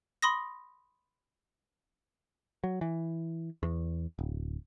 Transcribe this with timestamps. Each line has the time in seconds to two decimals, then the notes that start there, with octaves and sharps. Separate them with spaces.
0.22 B5 C6 D#6 A#6
2.64 F#3
2.81 E3
3.63 E2
4.19 D1